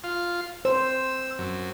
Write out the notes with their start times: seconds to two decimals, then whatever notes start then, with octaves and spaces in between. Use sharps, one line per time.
0.04 F4
0.65 C5 E6
1.39 F#2